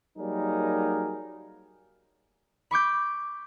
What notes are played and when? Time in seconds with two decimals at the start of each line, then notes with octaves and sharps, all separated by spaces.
0.18 F#3 G3 A#3 D#4 G#4 A#4
2.71 B5 C#6 D6 G6